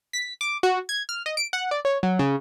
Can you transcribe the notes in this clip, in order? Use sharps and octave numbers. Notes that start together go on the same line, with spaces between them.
B6
D6
F#4
G#6
F6
D#5
D7
F#5
D5
C#5
F#3
C#3